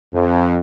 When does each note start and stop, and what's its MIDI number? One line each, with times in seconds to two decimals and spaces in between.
0.13 0.60 41